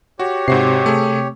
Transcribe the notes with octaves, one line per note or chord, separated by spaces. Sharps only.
F#4 G4 C#5
G#2 C3 F#4 C7
A3 G#4